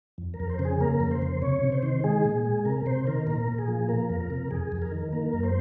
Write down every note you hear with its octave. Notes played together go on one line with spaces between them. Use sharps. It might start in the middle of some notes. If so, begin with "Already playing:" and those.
F2
A#4
F2
C5
C#3
G#4
A#3 A#4
F2
C5
C#3
C3 C#5
C3
C5
D#3
G#3 G#4
A#2
G#3
C3 A#4
C3 C5
D#3 A#4
A#2 A#4
A#2
G#4
F3
A#3 A#4
F2
A#4
C3
F2 G#4
F2
A#4
D#3
A#3 A#4
F#2
C5